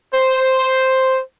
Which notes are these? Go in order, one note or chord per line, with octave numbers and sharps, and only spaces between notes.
C5